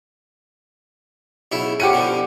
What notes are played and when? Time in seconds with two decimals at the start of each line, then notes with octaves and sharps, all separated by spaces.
1.52 B1 C#3 E4
1.80 A2 C#4 G4 F#5 D#7
1.93 B2 D3 F3